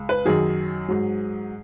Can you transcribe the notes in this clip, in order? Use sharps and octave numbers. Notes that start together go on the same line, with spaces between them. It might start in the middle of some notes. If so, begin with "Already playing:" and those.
Already playing: C#2
B4
F#2 D#3 F#3 G#4
G#2 F#3